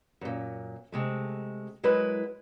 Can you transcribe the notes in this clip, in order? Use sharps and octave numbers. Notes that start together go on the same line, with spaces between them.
F#2 A#2
C3 G#3 A3
F#3 G#3 E4 A#4 B4